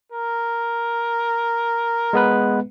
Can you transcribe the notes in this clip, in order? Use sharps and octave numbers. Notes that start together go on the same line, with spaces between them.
A#4
G#3 B3 B4